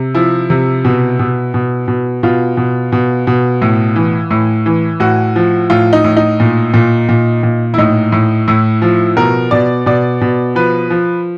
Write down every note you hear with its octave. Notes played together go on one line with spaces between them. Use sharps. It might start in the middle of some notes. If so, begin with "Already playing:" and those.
Already playing: C3
F3 E4
C3
B2
B2
B2
B2
B2 F4
B2
B2
B2
A2
E3
A2
E3
A2 F#4
F3
A2 F4
D#4
A2
D#4
A#2
A#2
A#2
A#2
E4
A2 D#4
A2
A2 E4
F3
B2 A#4
B2 D5
B2 D5
B2
F3 B4
F3